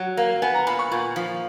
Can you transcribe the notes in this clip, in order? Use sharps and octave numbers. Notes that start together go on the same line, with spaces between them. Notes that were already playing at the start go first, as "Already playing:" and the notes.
Already playing: F#3
A#3
B3 G#5
A#5
A#2 B5
C#6
A#2
F3